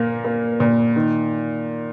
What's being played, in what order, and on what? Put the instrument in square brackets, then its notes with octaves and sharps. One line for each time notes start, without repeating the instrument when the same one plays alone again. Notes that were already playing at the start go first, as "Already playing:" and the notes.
Already playing: [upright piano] A#2 A#3
A#3
A#2
D#3